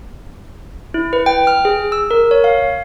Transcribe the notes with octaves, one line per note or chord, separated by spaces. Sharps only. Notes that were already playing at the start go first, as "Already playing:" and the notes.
E4
B4
G5
F6
G#4
E6
A#4
C#5
F5